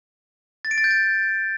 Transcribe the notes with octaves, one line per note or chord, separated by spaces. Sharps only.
A6
D7
A6
G6
A6